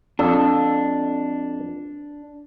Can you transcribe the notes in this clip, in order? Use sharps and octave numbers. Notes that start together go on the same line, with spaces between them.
F2 D4 A4